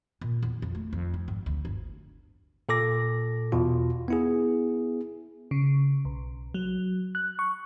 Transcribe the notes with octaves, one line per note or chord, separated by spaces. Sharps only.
A#2
E2
F2
A3
F2
D#3
G#2
D2
G1
A#2 A4 D6 A#6
E2 B2 F4
B3 E4 G#4
C#3
B1
F#3
F#6
C#6